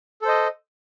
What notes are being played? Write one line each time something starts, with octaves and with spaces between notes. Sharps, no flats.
A4 C5 D#5